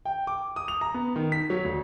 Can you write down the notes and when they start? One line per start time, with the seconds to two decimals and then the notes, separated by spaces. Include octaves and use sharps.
0.05 G5
0.27 D6
0.56 D#6
0.68 F7
0.81 A#5
0.94 B3
1.16 D#3
1.32 B6
1.50 F#3
1.65 D2